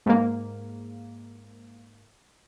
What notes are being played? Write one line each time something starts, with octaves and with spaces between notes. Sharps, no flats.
G#2 A#3